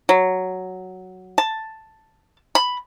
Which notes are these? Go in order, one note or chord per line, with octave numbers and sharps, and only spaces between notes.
F#3
A5
B5